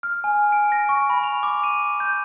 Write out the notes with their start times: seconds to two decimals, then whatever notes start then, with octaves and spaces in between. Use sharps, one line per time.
0.03 F6
0.24 G#5
0.52 D7
0.72 A#6
0.89 C#6
1.10 B5
1.23 F7
1.43 D6
1.64 D#7
2.00 G6